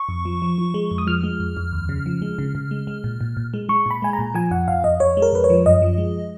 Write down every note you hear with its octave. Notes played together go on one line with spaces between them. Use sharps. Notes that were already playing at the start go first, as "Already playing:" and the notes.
Already playing: C#6
F2
F3
F3
F3
G#3
F2
D#6
F3 F6
G#3
F2
F2
D#2
C#3
F3
G#3
C#3
C#3
G#3
G#3
A#2
A#2
A#2
G#3
G#3 C#6
A#2 B5
G#3 G#5
A#5
A#2
F3 G#5
F2 F#5
F2 F5
F2 D#5
F2 C#5
G#3
A#4
F2 B4
C#5
F3
F#2 D#5
F3
G#3